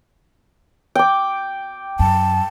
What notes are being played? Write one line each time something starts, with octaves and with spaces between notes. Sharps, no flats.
G5 D6
F#2 A5